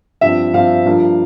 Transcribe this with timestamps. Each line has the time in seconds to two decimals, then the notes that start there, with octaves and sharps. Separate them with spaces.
0.21 G2 F3 C4 E5
0.53 G2 F3 C4 F5
0.86 G2 F3 A#3